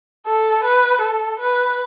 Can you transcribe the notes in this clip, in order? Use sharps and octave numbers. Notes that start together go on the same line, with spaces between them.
A4
B4
A4
B4